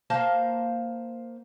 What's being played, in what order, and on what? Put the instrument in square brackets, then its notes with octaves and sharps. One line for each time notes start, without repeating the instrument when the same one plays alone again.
[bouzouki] A#3 C5 F5 A5